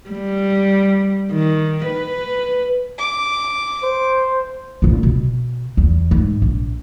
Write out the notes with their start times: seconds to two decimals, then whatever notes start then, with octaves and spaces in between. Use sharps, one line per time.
0.10 G3
1.32 D#3
1.86 B4
2.99 D6
3.83 C5
4.82 A#1 F4
5.03 B2
5.77 E2
6.11 G#2
6.42 A#1